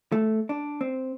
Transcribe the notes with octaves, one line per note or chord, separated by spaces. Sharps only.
A3
D4
C4